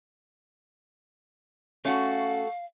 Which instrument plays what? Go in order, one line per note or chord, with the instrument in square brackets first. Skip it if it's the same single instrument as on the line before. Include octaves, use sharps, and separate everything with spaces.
[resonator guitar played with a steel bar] A3 F#4 [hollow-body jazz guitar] C#4 [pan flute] F5